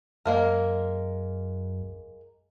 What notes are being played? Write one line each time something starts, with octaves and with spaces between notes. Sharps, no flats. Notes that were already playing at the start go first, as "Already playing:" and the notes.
F#2 G#3 A#3 A#4